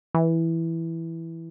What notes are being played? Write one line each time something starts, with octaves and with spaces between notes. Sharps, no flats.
E3